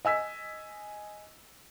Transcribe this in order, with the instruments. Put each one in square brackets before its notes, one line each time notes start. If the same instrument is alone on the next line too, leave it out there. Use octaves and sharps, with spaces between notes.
[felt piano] D#5 G#5 E6 B6